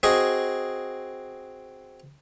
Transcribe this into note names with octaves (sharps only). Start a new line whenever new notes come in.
C4 F#4 G#4 D#5